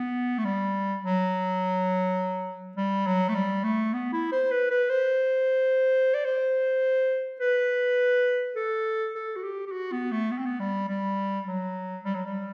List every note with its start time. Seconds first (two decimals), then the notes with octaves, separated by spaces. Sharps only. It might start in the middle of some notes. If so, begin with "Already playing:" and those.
Already playing: B3
0.38 A3
0.45 G3
1.03 F#3
2.77 G3
3.06 F#3
3.29 A3
3.35 G3
3.64 A3
3.93 B3
4.13 E4
4.32 C5
4.51 B4
4.71 B4
4.89 C5
6.14 D5
6.25 C5
7.40 B4
8.56 A4
9.15 A4
9.36 F#4
9.44 G4
9.67 G4
9.72 F#4
9.92 B3
10.11 A3
10.31 B3
10.38 C4
10.46 B3
10.60 G3
10.88 G3
11.47 F#3
12.04 G3
12.15 F#3
12.25 G3